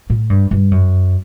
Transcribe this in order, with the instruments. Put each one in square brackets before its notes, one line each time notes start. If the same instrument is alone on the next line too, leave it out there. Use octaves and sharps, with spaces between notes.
[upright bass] A2
G2
G2
F#2